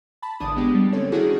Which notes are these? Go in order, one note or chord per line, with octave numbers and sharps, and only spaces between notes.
A5 B5
G#1 D3 E3 D4 D#6
G#3 B3 G4
G3
D3 C4 C#4 A4 C#5
D#3 D4 E4 F#4 G#4